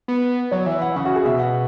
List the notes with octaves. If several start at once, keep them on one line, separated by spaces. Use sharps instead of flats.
B3
F#3 C#5
E3 E5
F#5
C#3 F#5
F#4
G#4
B2 E5
F#5